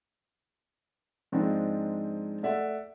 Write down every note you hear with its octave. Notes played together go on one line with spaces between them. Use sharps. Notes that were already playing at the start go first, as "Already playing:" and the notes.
G#2 F3 G#3 C4 D4 D#4
A3 D5 E5 F#5